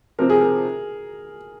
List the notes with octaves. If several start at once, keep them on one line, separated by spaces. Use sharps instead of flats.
C3 F3 C4 A#4
G#4
A#4